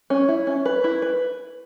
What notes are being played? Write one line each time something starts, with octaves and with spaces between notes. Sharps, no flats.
C#4
E4
C#4
B4
E4
B4